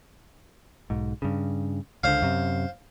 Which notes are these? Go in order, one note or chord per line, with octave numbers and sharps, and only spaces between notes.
B1 G#2
G2 C#3
C#2 D3 C5 F5
F#2 C3